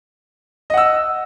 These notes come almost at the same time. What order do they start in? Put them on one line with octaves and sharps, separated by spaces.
D#5 F#5 E6